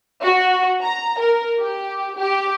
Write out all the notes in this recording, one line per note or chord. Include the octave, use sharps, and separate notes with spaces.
F#4
A#5
A#4
G4
G4